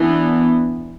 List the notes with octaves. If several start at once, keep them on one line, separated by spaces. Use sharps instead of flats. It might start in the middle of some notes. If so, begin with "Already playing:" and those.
Already playing: E3 B3 D4